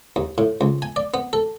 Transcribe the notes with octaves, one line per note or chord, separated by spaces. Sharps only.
D#2
A2
C#2
G#5
D5
B3
A4